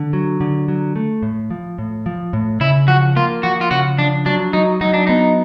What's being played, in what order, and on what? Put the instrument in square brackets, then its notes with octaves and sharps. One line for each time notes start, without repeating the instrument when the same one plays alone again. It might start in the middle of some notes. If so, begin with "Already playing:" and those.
Already playing: [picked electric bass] D3
F#3
D3
F#3
A3
A2
F3
A2
F3
A2
[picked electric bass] C#3 [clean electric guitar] E4
[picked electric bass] F3 [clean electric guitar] F#4
[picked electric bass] A#3 [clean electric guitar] F4
[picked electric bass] F3 [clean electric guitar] F#4
[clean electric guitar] F4
[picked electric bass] C#3 [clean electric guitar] F#4
[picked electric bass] F3 [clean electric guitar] D4
[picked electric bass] F#3 [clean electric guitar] D4
[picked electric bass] F#3 [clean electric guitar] D#4
[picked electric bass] F#3 [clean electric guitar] D#4
[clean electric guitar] D4
[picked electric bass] B3 [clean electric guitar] D#4